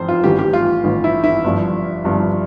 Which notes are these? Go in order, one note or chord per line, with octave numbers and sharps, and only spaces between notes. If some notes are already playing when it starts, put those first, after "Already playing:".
Already playing: F1 F2 E3 C5
F4
A1 A2 E3 G4
G4
F4
A1 A2 E3
E4
E4
G1 G2 F3
G1 G2 F3